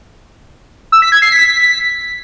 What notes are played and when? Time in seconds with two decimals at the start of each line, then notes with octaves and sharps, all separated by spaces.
0.92 E6
1.02 B6
1.12 G#6
1.22 C7
1.32 B6